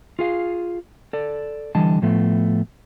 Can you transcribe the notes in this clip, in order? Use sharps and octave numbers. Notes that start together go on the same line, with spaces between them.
F4 G#4 F5
A4 D5
D3 E3 G3 D#5 A5
A2 F3 A3 B3